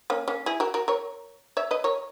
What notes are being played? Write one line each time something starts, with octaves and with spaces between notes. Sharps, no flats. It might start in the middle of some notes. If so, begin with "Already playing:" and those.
A#3 C#4
A#3 C#4
E4 G#4
F#4 A#4
F#4 A#4
A#4 C#5
C#5 E5
B4 D#5
A#4 C#5